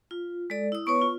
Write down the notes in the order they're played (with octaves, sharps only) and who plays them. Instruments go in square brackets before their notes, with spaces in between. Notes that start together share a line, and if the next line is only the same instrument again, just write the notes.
[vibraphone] F4
G#3 A4 D5
E4 D#6
[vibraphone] B3 B4 C#5 [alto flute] C#6
[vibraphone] F4